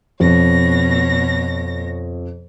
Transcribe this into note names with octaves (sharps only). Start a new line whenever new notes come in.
F2 B2 C#5 A#6